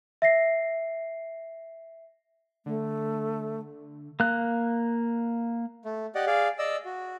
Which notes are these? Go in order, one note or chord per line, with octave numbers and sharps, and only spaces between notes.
E5 A#6 C7
D3 A3
A#3 F#6
A3
G4 D5 D#5 F#5
G#4 D5 F5
D5 D#5 E6
F#4